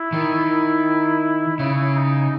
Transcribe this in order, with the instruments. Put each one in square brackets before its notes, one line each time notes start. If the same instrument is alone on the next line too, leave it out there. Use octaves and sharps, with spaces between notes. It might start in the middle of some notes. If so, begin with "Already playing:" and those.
Already playing: [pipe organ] E4
[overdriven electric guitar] D#3
[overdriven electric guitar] C#3 [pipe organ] E4
[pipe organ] D#4